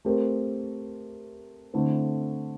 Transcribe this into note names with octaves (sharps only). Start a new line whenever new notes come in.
A3 C4 G4 A#4
D3 A3 C4 E4